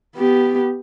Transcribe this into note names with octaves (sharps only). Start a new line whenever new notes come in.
B3 G4